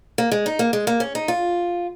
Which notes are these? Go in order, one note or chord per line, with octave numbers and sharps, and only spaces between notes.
A#3
G#3
D#4
A#3
G#3
A#3
C#4
D#4
F4